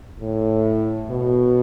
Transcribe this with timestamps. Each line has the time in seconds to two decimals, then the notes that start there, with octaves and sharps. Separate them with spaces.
0.20 A2
1.10 B2